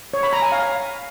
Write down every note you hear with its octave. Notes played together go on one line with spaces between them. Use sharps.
C#5
B5
A#5
G#5
F5